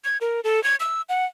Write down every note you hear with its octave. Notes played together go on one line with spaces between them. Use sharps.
G#6
A#4
A4
G#6
E6
F#5